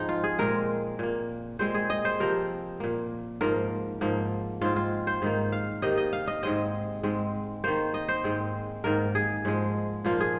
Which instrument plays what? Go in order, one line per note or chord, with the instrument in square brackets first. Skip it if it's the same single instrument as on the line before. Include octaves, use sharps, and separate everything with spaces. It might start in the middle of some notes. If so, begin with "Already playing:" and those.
Already playing: [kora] G#2 F3 G#3 C4 D#4
F4
G#4
A#2 G#3 C4 A#4
A#2 A#3
A#2 G#3 C4 C5
G#4
D#5
C5
C3 F3 C4 A#4
A#2 A#3
G#2 F3 A#3 A#4
G#2 F3 A#3
G#2 G#3 C4 F4
F4
C5
G#2 D#3 A#3
F5
C3 D#3 A#3 D#5
D#5
F5
D#5
G#2 G#3 C4 D#5
G#2 G#3 C4
D#3 A#3 C5
D#5
C5
G#2 G#3 C4
G#2 D#3 A#3 A#4
G#4
G#2 F3 G#3
A#2 F3 A#3 F4
G#4